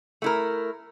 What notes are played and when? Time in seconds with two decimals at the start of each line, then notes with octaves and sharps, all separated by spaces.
0.22 A3 E4 A#4